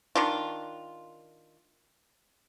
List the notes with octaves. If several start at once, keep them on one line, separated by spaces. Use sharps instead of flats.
D#3 D4 F4